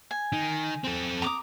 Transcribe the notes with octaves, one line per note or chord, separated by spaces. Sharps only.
G#5
D#3
C4 A4
A#5 D6 D#6